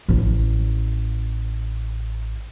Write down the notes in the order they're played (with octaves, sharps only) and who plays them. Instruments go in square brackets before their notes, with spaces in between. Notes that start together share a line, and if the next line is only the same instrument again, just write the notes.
[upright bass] A1 D4